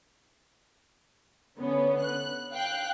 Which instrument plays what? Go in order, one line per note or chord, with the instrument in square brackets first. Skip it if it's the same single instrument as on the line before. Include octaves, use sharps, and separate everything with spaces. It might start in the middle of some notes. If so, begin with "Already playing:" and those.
[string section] D3 B3 C#4
F#6
F5 G5 F#6